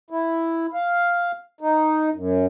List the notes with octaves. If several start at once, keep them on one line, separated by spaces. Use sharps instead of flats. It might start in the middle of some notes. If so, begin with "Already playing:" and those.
E4
F5
D#4
F#2